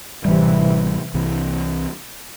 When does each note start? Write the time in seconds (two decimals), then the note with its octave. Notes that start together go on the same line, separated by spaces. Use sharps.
0.25 A1 A2 C3 E3 G3
1.14 C2 C3 E3 C4